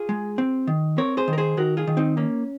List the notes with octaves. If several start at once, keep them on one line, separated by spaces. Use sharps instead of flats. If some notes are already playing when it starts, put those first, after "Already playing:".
Already playing: F4 G#4
G#3
C4
D#3
C4 A#4 C#5
G#4 C5
D#3
A#4
G#4 C5
D#3 F#4 A#4
F4 G#4
D#3
C4 D#4
A#3 C#4